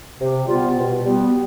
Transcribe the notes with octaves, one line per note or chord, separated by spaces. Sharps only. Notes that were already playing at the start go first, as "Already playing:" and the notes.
C3
G3 B3 F4
B2
G3 B3